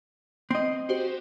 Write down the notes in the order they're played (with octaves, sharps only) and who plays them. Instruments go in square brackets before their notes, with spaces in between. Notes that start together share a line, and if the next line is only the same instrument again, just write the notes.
[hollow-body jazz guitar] C4 D#5
[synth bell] F#4 G4 C5